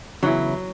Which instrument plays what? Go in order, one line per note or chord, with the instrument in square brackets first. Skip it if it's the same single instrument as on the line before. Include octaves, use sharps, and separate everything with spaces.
[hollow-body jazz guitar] E2 C#3 E3 C#4 E4 [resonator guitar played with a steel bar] F#3